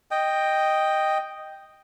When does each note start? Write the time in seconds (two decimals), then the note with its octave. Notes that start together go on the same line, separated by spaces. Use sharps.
0.11 D#5 G5